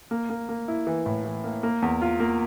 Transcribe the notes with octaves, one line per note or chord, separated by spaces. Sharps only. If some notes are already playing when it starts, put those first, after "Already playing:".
A#3
A#3
A#3
E4
E3
A2
E3
A#3
A#3
E2
F4
A#3